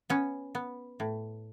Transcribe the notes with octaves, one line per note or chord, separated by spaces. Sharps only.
B3 C#4
B3
A2